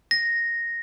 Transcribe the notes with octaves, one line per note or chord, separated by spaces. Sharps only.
A#6